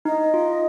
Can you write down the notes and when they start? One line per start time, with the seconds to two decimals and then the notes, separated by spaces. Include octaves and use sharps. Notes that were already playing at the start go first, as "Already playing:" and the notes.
0.05 D#4 D#5
0.34 F4